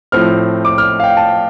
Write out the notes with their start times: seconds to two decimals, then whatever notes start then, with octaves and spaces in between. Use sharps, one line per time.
0.12 A2 F3 C4 F6
0.65 D6
0.78 F6
1.00 F5
1.04 G5
1.17 A5